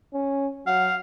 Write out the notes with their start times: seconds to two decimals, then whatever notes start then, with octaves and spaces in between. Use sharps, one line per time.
0.13 C#4
0.66 F#3 F5 F#5